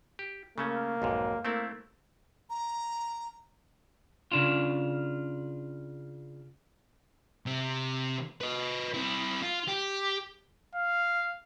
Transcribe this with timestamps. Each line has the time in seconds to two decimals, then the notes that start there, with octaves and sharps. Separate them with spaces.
0.19 G4
0.58 C#3 A3 A#3 C#4
1.02 B1 F2 G#2
1.45 A3 A#3 C4 E4
2.50 A#5
4.32 C#3 D4 F4
7.46 C3 C4
8.41 B4 D#5
8.94 C4 E4
9.43 F4
9.68 G4
10.75 F5